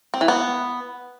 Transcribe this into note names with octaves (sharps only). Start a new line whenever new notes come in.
C4
E3
B3